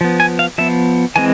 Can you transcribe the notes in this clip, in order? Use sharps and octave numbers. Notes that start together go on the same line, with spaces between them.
F3 B3
G#5
F5
F3 B3 E5
E3 G#3 C4 G#5